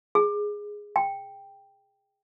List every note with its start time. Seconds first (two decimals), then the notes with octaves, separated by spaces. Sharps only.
0.15 G#4
0.96 G5